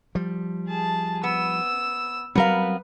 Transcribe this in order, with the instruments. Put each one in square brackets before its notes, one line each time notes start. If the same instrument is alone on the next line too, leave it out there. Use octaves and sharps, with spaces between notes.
[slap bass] F3 G3
[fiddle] G#4 A5
[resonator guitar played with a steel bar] B3 [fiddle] E6
[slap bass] F#3 G3 C4 [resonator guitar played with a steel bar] B3 A#4 F5 [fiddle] B4